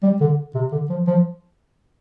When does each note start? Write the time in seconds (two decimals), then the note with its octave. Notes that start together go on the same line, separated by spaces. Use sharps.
0.03 G3
0.21 D3
0.55 C3
0.72 D3
0.90 F3
1.08 F3